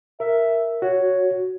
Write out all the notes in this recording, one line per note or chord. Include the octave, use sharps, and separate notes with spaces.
A#4 E5
F#4 C#5